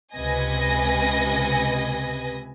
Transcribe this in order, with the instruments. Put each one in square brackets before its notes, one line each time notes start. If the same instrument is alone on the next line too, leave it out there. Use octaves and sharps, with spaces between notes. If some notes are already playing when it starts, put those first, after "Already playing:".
[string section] C#2 C3 B4 D#5 G#5 A#6